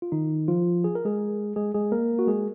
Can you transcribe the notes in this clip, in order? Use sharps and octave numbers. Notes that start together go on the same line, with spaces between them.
F4
D#3 D#4
F3 F4
G#4
A#4
G#3 G#4
G#3 G#4
G#3 G#4
A#3 A#4
F#4
G#3 G#4